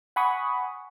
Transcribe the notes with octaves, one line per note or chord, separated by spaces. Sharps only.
F#5 G#5 B5 C#6 D#6